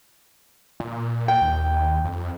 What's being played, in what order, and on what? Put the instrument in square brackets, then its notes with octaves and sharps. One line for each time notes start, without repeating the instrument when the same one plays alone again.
[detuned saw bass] A#2
[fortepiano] G5
[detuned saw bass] D#2
F2